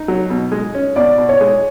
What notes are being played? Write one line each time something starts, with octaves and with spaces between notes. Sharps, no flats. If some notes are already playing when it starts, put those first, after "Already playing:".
Already playing: D#4
F#3
B2
G#3
C#4
B2 D5
B2
C#5
G#3